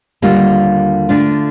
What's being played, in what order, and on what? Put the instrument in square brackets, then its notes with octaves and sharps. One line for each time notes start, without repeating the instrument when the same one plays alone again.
[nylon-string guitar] D#2 D3 G3 A#3 F4
D3 A3 D4 F4